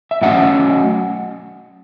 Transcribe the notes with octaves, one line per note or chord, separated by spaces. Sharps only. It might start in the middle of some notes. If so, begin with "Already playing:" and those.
E5
A2 F#3 A3 C#4 D#5 F#5